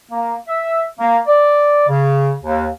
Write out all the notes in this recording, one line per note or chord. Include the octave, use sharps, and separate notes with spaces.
A#3
E5
A#3
D5
C#3
D#2